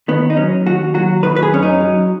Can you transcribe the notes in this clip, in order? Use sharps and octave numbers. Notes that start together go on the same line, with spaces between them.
D#3 B3
D#4
F#3 C#4
D#2 F#4
F#3 F#4
D#3 B4
B4
G#4
F#2 C#4
D#4
F#3